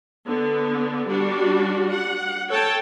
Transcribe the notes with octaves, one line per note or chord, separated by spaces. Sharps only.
D3 B3
G3 D4 F#4
F#5
A4 C#5 G5 A5